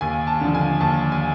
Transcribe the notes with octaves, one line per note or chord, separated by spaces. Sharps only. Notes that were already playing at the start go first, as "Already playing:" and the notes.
D#2 G#5
A5
D3 F3
G#5
D#2 A5
G#5